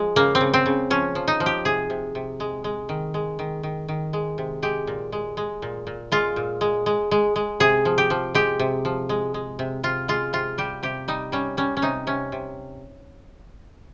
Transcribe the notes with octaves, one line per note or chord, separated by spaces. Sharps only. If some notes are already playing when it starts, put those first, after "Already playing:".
Already playing: F3 G#3
C#3 A#3
C4
C#3
C4
C#3
F3 C#4
F3
D#4
F3
G4
C3 G#4
C3
C3
G#3
G#3
D#3
G#3
D#3
D#3
D#3
G#3
C3
G#3 G4
A#2
G#3
G#3
A#2
A#2
G#3 F4
A#2
G#3
G#3
G#3
G#3
C3 G#4
F3
G4
F3
G#3 G4
C3
F3
G#3
G#3
C3
C3 F4
G#3 F4
C3 F4
G3 G4
C3 G4
G3 D#4
G3 C#4
G3 C#4
C#4
C3 D#4
C3 C#4
C3